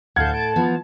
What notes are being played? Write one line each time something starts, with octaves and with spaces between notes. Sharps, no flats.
D2 A2 A4 F5 F#5 A5 G6 G#6
A5 D7
F3 B3